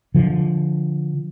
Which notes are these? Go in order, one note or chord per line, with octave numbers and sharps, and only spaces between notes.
D3 F3